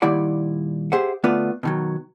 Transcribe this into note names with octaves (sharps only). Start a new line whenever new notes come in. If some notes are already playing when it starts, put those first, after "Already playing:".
A#2 D#3 G3 E4 D5 F#5
G4 G#4 C5 E5 F#5
D3 A3 B3 F4 B4 D5
B2 D#3 F#3